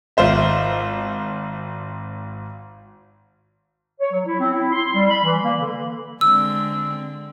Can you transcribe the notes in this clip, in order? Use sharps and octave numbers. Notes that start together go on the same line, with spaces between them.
G#1 F4 C5 E5
C#5
F#3
E4
C4
E4
C6
G3
B5
E3
A#3
D3
D3 G#3 C4 E6